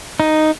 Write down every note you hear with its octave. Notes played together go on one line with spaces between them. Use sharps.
D#4